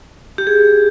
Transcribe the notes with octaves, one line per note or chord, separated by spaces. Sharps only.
G4
G#4